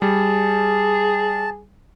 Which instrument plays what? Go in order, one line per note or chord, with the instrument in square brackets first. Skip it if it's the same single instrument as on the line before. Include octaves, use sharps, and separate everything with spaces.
[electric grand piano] G3 [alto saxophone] G#4 [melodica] A5